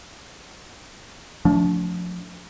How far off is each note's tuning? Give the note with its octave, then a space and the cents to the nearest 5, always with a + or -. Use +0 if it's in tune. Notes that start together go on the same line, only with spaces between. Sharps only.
F3 +30 A3 +0 D4 -35